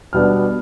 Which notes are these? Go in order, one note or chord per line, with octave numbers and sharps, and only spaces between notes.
B2 G3 B3 D4 F6